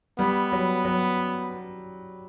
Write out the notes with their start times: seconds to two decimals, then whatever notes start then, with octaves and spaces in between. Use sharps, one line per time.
0.19 G3 B3
0.52 F#3
0.85 F#3